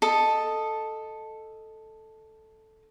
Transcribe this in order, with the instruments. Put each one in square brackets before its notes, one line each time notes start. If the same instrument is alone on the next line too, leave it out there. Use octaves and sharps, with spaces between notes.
[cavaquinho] A4 D#5